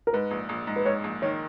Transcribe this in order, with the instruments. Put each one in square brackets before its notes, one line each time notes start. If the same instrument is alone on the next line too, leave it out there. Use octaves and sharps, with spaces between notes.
[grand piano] A#4
[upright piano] G#2 [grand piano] B4
[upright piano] A#1
A#1
G#2
[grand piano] B4
[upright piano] G#2 [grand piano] C#5
[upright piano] A#1
[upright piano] D#3 [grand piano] C#5